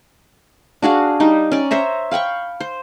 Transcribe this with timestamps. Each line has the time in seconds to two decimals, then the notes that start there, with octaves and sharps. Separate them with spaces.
0.82 D4 F#4 G#4 F5
1.20 G3 D#4
1.52 C#4 D5
1.71 C5 C#5 E5 A#5
2.11 F5 G5 B5 C#6
2.60 C5